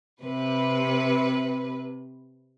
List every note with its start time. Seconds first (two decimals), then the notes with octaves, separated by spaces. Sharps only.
0.22 C3 B4